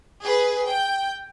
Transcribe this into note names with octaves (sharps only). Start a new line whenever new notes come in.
G#4 B4
G5